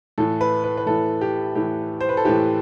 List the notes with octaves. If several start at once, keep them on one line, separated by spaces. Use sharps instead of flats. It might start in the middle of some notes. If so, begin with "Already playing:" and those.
A2 E3 A4
B4
B4
B4
A2 E3 A4
G4
A2 E3 G4
C5
B4
A4
A2 E3 G4